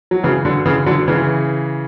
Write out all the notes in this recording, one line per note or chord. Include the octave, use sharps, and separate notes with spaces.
F#3
C#3 E3
D3 F#3
C#3 E3
D3 F#3
C#3 E3